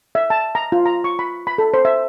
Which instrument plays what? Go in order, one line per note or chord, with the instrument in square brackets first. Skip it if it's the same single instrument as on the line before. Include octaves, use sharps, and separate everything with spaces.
[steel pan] E5
A5
A#5
F4
A#5
C#6
B5
B5
A4
C5
E5